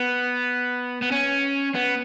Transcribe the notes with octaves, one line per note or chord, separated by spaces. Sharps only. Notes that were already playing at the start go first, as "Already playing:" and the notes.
Already playing: B3
B3
C#4
B3